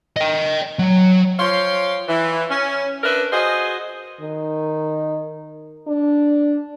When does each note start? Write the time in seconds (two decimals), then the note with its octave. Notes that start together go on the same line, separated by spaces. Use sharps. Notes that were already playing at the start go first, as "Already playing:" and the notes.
0.17 D#5 G5
0.79 F#3
1.39 F3 C#5 F5 G5 C6
2.08 E3
2.50 C#4
3.03 D4 A#4 B4 D5 E5
3.32 F#4 G#4 C5 D#5
4.21 D#3
5.87 D4